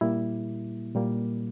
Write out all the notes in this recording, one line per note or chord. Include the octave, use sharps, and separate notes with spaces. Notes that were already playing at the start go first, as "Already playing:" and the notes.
A#2 G3 A#3 E4
A#2 G3 A#3